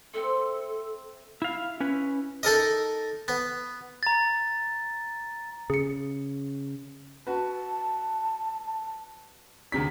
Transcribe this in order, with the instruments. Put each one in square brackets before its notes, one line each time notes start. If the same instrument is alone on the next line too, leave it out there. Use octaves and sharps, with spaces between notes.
[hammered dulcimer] C4 E5 C6 [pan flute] A4
[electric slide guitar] E4 F5
C#4 E4 B4
[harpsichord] D#4 A4 A#4 D#5
B3
[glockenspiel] A#5 A6
[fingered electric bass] C#3 [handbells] G#4 C#7
[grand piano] F#4 B4 [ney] A5
[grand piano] D2 C3 B6 [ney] G#4